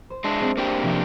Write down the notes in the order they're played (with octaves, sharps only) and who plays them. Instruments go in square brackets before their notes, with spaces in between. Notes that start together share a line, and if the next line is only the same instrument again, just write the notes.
[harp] C5
[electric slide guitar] G#3 D4 [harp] E5
[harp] C4 G#4
[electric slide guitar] A#3 D4 G4
[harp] C3 F3